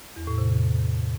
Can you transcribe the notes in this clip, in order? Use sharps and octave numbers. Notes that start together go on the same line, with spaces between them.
E2
A2
C3
E2
E2